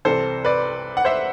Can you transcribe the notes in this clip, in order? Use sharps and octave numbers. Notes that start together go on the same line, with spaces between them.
C2 C3 E3 A4 C5
B4 D5
F#5
C5 E5